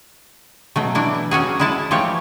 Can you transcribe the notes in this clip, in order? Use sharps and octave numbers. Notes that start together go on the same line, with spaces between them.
B2 F#3 A3
E3 D4 E4
F#3 C#4 F#4 G#4
G#3 E4 A5
E3 F3 A3 G4 C#5